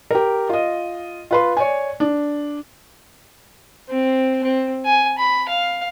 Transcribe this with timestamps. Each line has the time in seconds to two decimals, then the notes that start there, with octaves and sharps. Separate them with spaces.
0.11 G4 A#4
0.49 F4 D#5
1.31 F4 B4 C6
1.57 C#5 D5 G#5
2.00 D4
3.89 C4
4.44 C4
4.86 G#5
5.18 B5
5.49 F5